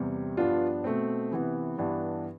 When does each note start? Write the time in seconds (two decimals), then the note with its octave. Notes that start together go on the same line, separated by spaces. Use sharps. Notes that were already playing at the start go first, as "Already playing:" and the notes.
Already playing: E2 C3 G3
0.37 G2 F3 B3 D4 F4
0.84 B2 A3 C4
1.31 C3 E3 B3
1.78 G2 E3 B3 D4